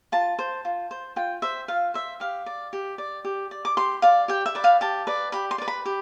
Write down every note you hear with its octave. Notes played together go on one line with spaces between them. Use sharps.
F4 A5
C5
F4
C5
F4 G5
C5 E5
F4 F5
C5 E5
G4 F5
D5
G4
D5
G4
D5
D6
G4 C6
D5 F5
G4 G5
E5
B4 D5
F5
G4 A5
B4 D5
G4 B5
C6
B4 D5
B5
G4